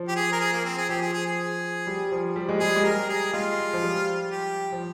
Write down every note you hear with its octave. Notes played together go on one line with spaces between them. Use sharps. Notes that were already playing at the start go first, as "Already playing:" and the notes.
Already playing: F3
G4
G#4
A#4
G#4
A#3
C4
G#4
F3 G4
G#4
G#4
G#4
G3
F3
G3
G#3
G3 G#4
G#3
G3 A#4
G#4
G#3 F4
F3
G3
G4
F3